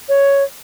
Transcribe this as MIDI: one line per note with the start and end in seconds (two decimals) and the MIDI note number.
0.09 0.43 73